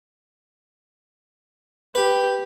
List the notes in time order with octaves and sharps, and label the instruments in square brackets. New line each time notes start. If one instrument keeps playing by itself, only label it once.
[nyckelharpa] G4 [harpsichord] B4